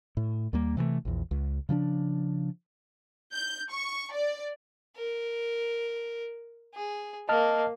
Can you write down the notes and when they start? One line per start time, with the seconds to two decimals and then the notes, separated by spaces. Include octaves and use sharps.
0.17 A2
0.53 D#2 G3 A#3
0.77 C3 E3 F3 A3
1.05 A#1 E2
1.31 C#2
1.69 C#3 F3 C#4 D4
3.33 G6
3.71 C#6
4.13 D5
4.97 A#4
6.75 G#4
7.29 A#3 D#5 A5 F6